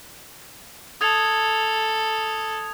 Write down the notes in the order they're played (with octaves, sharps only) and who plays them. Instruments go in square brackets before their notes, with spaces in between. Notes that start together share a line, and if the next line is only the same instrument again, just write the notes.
[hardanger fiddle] A4 [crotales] D#6 G#6 F7